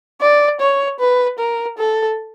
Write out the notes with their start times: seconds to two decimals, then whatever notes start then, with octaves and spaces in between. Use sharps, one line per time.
0.21 D5
0.60 C#5
1.00 B4
1.39 A#4
1.78 A4